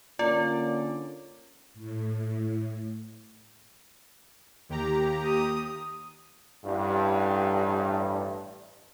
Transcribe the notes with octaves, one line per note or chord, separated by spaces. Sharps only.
D3 A#3 C#4 F4 D5
A2
D#2 G4 A#5
D#6
A1 G2